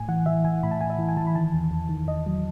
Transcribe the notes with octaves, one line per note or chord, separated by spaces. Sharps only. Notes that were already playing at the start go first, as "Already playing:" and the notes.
Already playing: A2 G#5
E3 F#5
E3 E5
E3 G#5
A2 B5
A5
A2 G#5
E5
E3
G#5
E3 A5
B5
D#3 A5
E2
E2
D#3
E2 D#5
F#3